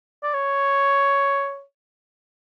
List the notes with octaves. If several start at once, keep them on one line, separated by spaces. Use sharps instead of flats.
D5
C#5